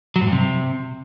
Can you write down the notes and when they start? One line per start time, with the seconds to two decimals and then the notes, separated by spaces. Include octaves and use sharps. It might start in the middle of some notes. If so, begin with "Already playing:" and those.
0.16 F#3
0.21 G#2
0.27 G2
0.32 C3